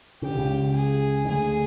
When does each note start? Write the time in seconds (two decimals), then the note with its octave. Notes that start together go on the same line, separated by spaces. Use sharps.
0.22 C#3 G4
0.31 D3
0.38 C#2 C#3
0.76 G#4
1.25 D#3
1.28 D2 D3 G#4